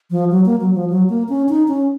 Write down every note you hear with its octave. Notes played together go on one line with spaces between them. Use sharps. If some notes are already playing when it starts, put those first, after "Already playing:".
F3
F#3
A#3
F#3
F3
F#3
A#3
C#4
D#4
C#4